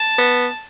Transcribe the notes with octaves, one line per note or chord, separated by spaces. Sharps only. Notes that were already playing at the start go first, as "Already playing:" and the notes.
Already playing: A5
B3